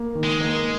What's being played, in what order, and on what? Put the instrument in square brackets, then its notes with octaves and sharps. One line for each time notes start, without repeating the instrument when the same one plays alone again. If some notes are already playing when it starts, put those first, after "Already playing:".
Already playing: [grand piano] A#3
D#3
[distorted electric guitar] G#3
[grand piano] A#3